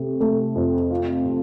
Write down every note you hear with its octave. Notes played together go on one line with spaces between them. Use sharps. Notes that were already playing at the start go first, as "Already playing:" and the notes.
Already playing: C3 A3
A3
F2
F4
C3